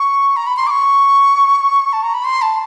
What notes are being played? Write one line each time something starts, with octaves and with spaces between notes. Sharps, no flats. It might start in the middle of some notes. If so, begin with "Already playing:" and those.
Already playing: C#6
A#5
B5
C6
D6
C#6
A5
A#5
B5
C6
A5